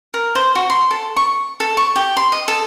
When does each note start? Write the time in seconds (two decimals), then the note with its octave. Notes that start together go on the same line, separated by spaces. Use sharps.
0.14 A#4
0.35 C5
0.55 F#4
0.70 C6
0.91 A4
1.16 C#6
1.60 A4
1.77 C#6
1.96 G4
2.17 C6
2.32 D#5
2.48 A4